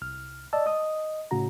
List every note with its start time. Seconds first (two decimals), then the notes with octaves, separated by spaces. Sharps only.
0.02 C2 F6
0.53 D5 D#5 A5 E6
0.66 D#5 D#6
1.31 A2 C#3 F#4 A#5